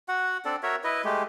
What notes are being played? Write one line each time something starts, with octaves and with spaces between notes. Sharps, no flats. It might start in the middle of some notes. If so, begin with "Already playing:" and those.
F#4 F#5
C4 D4 A4 D5
F#4 A#4 C#5 E5
E4 B4 D#5
G#3 A3 G4